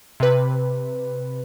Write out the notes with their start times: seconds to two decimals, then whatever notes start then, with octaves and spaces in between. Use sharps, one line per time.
0.20 C3 B4